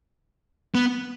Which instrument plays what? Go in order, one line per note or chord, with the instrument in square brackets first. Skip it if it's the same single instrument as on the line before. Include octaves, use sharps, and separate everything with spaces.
[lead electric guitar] B3